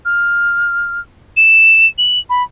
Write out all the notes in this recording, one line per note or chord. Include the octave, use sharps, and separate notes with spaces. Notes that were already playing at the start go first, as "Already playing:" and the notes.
F6
E7
F#7
B5